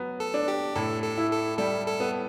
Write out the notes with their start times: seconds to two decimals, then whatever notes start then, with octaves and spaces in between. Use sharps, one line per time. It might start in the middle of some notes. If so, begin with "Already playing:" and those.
Already playing: F#3 B3
0.20 A4
0.34 D4
0.48 G4
0.76 A2 A4
1.03 A4
1.18 E4
1.31 A4
1.58 G3 A4
1.87 A4
2.00 B3